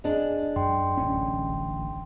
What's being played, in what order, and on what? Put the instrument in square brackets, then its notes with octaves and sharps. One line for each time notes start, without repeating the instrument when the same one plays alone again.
[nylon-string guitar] G#3 D4
[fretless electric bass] F#2 [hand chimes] G5 C6
[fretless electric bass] D1 A1 C#4